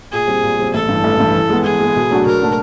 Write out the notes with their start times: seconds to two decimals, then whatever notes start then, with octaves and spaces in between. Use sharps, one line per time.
0.12 A#2 G#4
0.28 G3 C4
0.43 A#2
0.59 G3 C4
0.74 A1 A4
0.89 G2 E3
1.04 A1
1.20 G2 E3
1.34 E3
1.50 G#3 B3
1.64 E3 G#4
1.81 G#3 B3
1.96 B2
2.11 F#3 A3 D4 F#4
2.26 B2 A#4
2.41 F#3 A3 D4 F#4